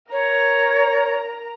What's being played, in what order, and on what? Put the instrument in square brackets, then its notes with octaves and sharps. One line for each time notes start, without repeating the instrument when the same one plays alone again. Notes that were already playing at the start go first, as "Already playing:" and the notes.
[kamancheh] A#4 A#5 [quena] C#5